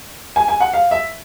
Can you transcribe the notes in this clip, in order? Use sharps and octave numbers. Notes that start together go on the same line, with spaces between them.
G#5
G#5
F#5
F5
E5